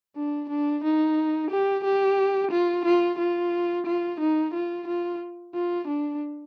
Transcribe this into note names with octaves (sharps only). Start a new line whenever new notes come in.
D4
D4
D#4
G4
G4
F4
F4
F4
F4
D#4
F4
F4
F4
D4